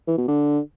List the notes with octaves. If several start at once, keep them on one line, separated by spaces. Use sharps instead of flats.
E3
B2
D3